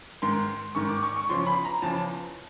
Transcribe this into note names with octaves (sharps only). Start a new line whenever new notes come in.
G#2 D#3 C6
G#2 D#3 C#6
D6
C#6
C#6
E2 C#3 F3 C6
B5
A#5
E2 C#3 F3 A5